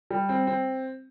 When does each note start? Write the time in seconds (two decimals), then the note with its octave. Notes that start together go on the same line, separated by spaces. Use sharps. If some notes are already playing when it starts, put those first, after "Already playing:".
0.11 G3
0.29 C4
0.47 C4